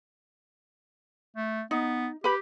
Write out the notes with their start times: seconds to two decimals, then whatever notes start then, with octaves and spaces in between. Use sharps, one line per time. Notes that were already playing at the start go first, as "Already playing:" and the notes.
1.37 A3
1.71 B3 D#4
2.24 G4 B4 B5